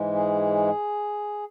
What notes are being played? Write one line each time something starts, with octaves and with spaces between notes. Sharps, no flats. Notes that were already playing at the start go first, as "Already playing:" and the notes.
Already playing: G#2 E3 G#3
G#4